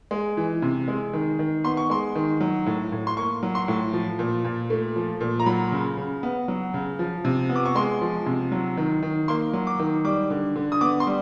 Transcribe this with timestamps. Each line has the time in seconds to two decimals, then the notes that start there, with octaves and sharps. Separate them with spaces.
0.11 G#3
0.37 E3
0.62 C3
0.88 G#3
1.13 D#3
1.39 D#3
1.64 B3 C6
1.77 C#6
1.90 G#3 C6
2.15 D#3
2.41 F#3
2.66 A2
2.92 A2
3.07 C6
3.17 A#3 C#6
3.43 F#3
3.55 C6
3.68 A2
3.93 F3
4.19 A#2
4.44 A#2
4.70 A3
4.96 F3
5.21 A#2
5.40 A#5
5.46 F#3 B5
5.72 C#3
5.97 C#3
6.23 B3
6.48 F#3
6.74 C#3
6.99 F3
7.25 C3
7.49 B3
7.56 D6
7.65 C#6
7.75 G#3 C6
8.01 F3
8.26 C3
8.52 F#3
8.77 D#3
9.03 D#3
9.28 A#3 C6
9.53 F#3
9.67 D6
9.79 D#3
10.05 G3 D6
10.30 D3
10.56 D3
10.72 D#6
10.81 B3 D6
11.00 C6
11.07 G3